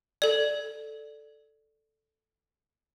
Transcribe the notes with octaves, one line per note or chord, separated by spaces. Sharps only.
A4 D5